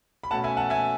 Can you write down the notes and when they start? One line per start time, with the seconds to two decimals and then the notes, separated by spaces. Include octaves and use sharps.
0.24 B5
0.31 B2 A3 C#4 F#5 A5
0.44 E5 G#5
0.57 F#5 A5
0.70 E5 G#5